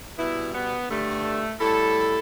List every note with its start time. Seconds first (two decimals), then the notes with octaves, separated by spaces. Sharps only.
0.17 B2 G3 B3 E4
0.53 B3
0.89 G2 D3 G3 A3
1.59 A2 G3 E4 A4